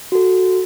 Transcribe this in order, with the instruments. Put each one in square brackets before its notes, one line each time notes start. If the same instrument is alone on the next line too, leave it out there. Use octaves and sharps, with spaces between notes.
[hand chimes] F#4 A4